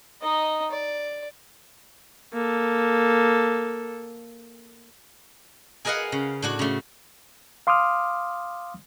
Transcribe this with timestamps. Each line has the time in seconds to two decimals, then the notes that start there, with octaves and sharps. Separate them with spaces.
0.22 D#4 D#5
0.71 D5
2.34 A#3 A4
5.85 G#4 A#4 B4 D#5 F5 F#5
6.12 C#3
6.42 A2 D4 F#4
6.59 C#3 A3
7.67 F5 C6 D6 D#6 F6